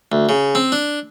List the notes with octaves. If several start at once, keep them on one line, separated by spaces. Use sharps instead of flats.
D2
C#3
C4
D4